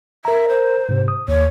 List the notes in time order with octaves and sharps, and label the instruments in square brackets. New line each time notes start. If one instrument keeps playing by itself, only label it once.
[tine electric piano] A#4 A#5 [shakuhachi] E5
[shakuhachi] C5
[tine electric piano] G#2 C3
D#6
[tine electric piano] D#2 [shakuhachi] C#5